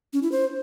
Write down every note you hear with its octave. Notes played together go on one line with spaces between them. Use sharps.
C#4
E4
C5